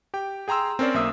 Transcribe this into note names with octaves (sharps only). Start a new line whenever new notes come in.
G4 G5
G#4 G5 A#5 C6 E6
C4 C#4 A#4 C5 D5
B1 A#3 E5 D#6 E6